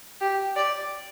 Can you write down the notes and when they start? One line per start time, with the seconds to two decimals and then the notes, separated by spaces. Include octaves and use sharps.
0.21 G4
0.56 D5